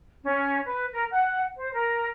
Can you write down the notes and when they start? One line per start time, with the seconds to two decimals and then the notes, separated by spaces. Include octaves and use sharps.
0.24 C#4
0.64 B4
0.92 A#4
1.11 F#5
1.57 C5
1.73 A#4